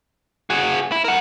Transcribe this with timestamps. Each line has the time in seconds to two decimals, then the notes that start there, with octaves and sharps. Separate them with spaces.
0.50 F#4 G#4
0.92 E4
1.04 A#4 F#5